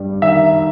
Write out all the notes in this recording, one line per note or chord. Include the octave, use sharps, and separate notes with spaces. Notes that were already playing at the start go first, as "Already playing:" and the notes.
Already playing: G2 G3
D#3 E5